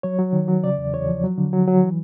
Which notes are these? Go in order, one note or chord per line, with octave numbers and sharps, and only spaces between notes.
F#3 C#5
F#3
D#3
F#3
C#3 D5
E2
E2 C#5
F3
F#3
D3
F#3
F#3
E3